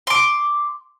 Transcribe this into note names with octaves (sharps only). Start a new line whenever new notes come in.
C6 D6